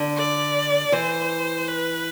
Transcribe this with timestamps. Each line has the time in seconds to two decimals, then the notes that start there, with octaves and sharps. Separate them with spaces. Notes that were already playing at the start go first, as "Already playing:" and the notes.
Already playing: D3
0.17 D5
0.92 E3 C5
1.67 B4